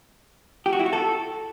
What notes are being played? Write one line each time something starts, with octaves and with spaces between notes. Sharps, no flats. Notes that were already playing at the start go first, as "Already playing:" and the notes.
G4
F#4
E4
F#4
A4